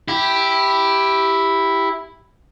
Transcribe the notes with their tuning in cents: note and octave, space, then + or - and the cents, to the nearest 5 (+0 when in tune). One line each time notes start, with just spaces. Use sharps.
E4 +0 G4 +0